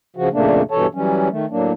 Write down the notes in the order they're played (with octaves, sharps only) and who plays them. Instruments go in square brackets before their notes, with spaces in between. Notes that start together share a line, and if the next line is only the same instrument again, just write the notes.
[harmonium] C#3 F3 F#4
F2 A#2 C#3 A3 A#3 D4
G2 B2 E3 A4 C#5 A5
E3 F#3 G3 C#4
D#3 A3
A2 F#3 A#3 D4